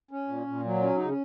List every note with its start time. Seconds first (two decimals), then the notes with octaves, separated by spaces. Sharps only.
0.11 C#4
0.28 A#2
0.47 A#2
0.64 F#3
0.81 C#4
0.96 C#3 D#4
1.09 C#4